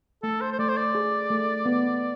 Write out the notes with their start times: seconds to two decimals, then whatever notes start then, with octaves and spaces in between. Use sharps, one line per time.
0.23 A3 A4
0.41 C5
0.52 C5
0.59 A3 D5
0.69 C5
0.77 D5
0.95 G#4
1.30 A3
1.65 B3